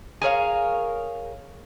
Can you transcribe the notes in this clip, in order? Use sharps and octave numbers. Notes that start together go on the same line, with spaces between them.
G#4 A#4 C#5 F5